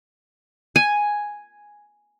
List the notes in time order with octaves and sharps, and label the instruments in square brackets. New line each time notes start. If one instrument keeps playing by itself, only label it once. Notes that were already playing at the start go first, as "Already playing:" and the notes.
[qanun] G#5